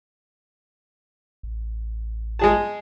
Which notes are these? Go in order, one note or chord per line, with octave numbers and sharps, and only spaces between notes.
A1
G#3 G#4 A5